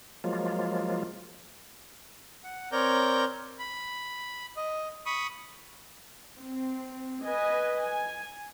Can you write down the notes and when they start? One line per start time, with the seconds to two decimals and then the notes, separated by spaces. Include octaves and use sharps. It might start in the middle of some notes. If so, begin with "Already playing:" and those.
0.24 F3 F#3 G#3 A#3 F4
2.44 F#5
2.72 C4 A#4 C#5 D5 A#5 G6
3.59 B5
4.57 D#5
5.06 B5 C#6 D#6
6.38 C4
7.22 B4 D#5 G#5
7.80 G#5